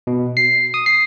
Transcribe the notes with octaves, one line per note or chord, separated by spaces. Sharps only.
B2
C7
D#6
C7